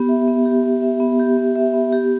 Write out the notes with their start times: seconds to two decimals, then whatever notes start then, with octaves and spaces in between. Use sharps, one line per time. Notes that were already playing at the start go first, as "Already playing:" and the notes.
Already playing: B3 G4
0.09 E5
0.28 B3
0.46 G4
0.64 B3
0.82 E5
1.00 B3
1.19 G4
1.37 B3
1.56 E5
1.74 B3
1.92 G4